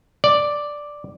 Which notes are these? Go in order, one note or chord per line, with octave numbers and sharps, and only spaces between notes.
D5